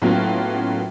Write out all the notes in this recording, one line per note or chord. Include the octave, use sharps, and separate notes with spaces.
A2 F#3 A#3 B3 C#4 F4